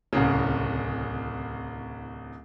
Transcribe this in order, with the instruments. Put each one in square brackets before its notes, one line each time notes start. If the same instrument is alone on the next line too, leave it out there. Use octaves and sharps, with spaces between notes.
[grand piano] D1 C2 C#3